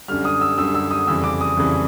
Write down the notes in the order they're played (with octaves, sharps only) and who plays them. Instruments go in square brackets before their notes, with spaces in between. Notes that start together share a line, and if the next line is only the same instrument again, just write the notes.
[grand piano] F#2 D3 G3 F6
D#6
E6
F#2 D3 G3 E6
E6
D#6
F2 C#3 E3 G3 E6
D6
D#6
F2 C#3 E3 G3